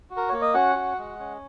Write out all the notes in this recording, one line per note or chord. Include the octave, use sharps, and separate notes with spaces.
F#4
A#4
A#3 C#5
D#5
C#4 F#4 F#5
F#4
G#3
C#4